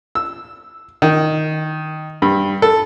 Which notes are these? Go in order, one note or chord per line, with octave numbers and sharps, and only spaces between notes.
E6
D#3
G2
A4